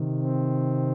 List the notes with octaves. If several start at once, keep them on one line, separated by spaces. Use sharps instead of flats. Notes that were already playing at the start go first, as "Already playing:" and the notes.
Already playing: C3 D#3
C4